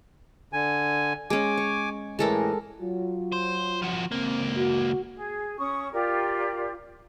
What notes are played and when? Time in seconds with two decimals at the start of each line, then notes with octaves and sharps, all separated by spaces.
0.53 D3 G#5
1.30 G#3 C#4 G#5 D6
1.58 C#5
2.19 A2 E3 G#3 A4 A#4
2.81 F#3 F4
3.32 C5
3.82 F3 F#4
4.12 C#2 A#3 C4
4.56 F#4
5.14 G#4
5.58 C#4 C#6 D#6
5.92 F4 G4 A#4 D5